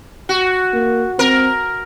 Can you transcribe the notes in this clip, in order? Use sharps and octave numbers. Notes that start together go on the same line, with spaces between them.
F#4
A#3
C4 A#4